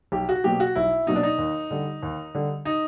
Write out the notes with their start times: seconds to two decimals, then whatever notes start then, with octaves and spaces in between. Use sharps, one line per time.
0.12 B1 G4
0.29 F#4
0.44 B2 F#3 A#3 G4
0.60 F#4
0.75 B1 E4
1.07 B2 F#3 A#3 D#4
1.16 D4
1.23 D#4
1.38 D#2
1.71 D3 G3
2.03 D#2
2.35 D3 G3
2.65 D#4